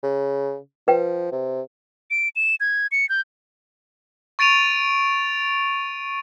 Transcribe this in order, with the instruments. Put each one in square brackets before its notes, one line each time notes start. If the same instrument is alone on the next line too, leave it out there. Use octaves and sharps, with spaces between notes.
[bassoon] C#3
[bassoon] F3 [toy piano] B4 G5
[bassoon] C3
[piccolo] D7
E7
G#6
C#7
G6
[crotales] C#6 A6 D7 D#7 F7